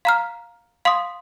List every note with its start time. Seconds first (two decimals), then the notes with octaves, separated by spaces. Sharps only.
0.05 F5 A#5 F6
0.85 F5 C6 D#6